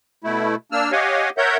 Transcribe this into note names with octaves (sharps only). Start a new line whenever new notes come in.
B2 A3 E4
A#3 D4 E6 F6
G4 C#5 D#5 F5 F#5 G#5
A#4 C#5 E5 F#5 G6